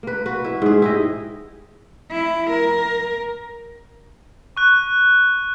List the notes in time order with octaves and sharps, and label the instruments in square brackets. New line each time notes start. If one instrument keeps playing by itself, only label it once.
[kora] A#3 B4
F#4 B4
E4 E5
G#2 G#4
E4 G4 D#5
[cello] E4
A#4
[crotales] C#6 F#6